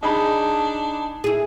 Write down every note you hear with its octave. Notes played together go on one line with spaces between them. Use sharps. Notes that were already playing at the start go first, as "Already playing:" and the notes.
D4 D#4 G#4 B5
E4 G#4